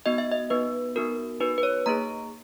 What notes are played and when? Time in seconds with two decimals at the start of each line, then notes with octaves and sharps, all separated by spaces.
0.06 B3 D#4 F#4 D#5
0.18 E5
0.32 D#5
0.50 B3 D#4 F#4 B4
0.96 B3 D#4 F#4 A#4
1.40 B3 D#4 F#4 B4
1.58 B4
1.63 C#5
1.86 A#3 D#4 G#4 A#5